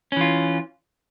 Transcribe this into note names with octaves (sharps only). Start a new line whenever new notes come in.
E3 C#4 F4